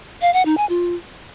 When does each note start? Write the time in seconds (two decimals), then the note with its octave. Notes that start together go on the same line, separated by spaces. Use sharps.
0.21 F5
0.33 F#5
0.45 D#4
0.57 G#5
0.69 F4